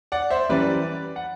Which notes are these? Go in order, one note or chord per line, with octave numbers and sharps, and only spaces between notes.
D5 F#5
C5 E5
F#2 E3 G3 B4 D5
F#5